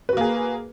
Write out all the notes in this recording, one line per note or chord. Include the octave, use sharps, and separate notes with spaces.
A#3 F#4 G#4 B4